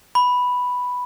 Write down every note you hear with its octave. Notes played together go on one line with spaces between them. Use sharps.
B5